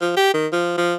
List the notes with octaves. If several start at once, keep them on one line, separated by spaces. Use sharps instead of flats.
F3
G4
D#3
F3
F3